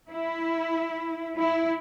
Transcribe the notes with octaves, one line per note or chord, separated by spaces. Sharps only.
E4
E4